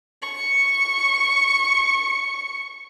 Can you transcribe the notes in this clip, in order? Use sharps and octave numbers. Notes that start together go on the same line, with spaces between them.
C#6 C#7